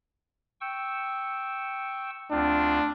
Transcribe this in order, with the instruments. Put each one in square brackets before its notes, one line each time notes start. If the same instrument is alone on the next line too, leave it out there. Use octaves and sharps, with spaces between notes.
[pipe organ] G5 C#6 E6
[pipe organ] D2 C4 F4 [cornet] D4